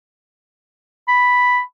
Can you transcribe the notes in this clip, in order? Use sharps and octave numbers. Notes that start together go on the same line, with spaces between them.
B5